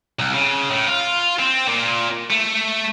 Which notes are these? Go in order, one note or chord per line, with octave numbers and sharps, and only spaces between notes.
C2
C#3
A2
F4
C4
A#2
A3